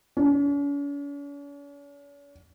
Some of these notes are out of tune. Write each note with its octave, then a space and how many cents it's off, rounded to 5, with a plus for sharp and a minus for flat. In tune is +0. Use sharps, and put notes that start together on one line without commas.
C#4 +45